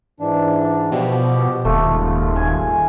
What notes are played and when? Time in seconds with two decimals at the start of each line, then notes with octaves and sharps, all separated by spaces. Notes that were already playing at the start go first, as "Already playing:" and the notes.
0.20 G#2 E3 D4
0.91 B2 F3 G4
1.65 D#1 D#2 G#2 A3 F4
2.36 G#5